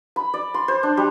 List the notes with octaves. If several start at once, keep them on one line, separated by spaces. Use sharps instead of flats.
B5
D5
C6
C5
D4
G3